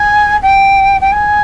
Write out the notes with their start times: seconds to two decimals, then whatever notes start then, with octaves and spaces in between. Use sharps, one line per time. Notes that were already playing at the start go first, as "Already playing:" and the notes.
Already playing: G#5
0.42 G5
1.01 G5
1.12 G#5